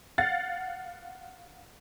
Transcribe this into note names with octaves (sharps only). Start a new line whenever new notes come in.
F5 F#5 A6